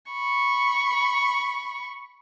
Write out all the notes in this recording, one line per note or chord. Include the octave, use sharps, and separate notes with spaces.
B5 C#6